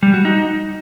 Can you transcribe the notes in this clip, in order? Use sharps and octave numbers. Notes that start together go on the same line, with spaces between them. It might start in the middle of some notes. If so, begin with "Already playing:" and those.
G3
F#4
D#4